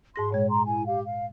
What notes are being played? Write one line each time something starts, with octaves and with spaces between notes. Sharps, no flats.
G#2 G#4 C6 A#6
A#2 G#3 C#5
A#5 C6
E4 G#5
G4 F5
F5